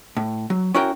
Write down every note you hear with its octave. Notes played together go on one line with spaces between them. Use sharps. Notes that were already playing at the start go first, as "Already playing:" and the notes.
A2
F#3
C#4 E4 F#4 A#4 G5